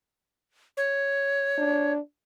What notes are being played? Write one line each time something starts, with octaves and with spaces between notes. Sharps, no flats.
C#5
D4